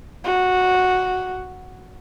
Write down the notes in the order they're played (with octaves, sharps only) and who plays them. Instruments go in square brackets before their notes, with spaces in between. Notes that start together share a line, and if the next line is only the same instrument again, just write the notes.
[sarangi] F#4